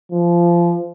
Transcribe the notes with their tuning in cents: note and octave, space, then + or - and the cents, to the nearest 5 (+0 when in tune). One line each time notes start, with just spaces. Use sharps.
F3 -20